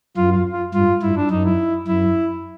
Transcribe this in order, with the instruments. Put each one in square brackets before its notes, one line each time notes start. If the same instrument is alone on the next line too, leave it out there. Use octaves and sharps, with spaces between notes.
[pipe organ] F#2 [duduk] F4
[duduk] F4
F4
[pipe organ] G2 [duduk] F4
[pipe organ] G2 [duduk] E4
[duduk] D4
[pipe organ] F#2 [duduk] D#4
[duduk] E4
[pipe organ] F#2 [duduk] E4